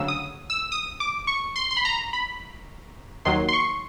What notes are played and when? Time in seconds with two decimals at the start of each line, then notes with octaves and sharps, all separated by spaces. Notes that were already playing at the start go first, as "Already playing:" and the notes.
Already playing: D2 C#3 F#3 E6
0.08 D#6
0.50 E6
0.72 D#6
1.00 D6
1.27 C#6
1.56 C6
1.71 C6
1.77 B5
1.85 A#5
2.13 B5
3.25 D#2 D#3 F#3 C6
3.49 C6
3.53 C#6